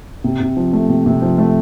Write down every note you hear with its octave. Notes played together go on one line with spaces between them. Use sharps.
C3
C3
F3
A3
C3
C3
F3
A3